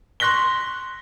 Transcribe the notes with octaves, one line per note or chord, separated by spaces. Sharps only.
C6 C#6 F#6 A#6 B6 G7